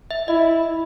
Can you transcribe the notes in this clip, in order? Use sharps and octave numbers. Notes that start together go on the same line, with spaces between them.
E5
E4 D#5